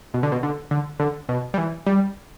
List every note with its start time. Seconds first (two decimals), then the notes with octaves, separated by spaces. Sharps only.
0.14 B2
0.23 D3
0.32 B2
0.43 D3
0.71 D3
1.00 D3
1.29 B2
1.54 G3
1.58 E3
1.86 G3